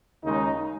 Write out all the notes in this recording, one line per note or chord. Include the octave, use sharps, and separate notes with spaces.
D#2 C#3 G#3 D#4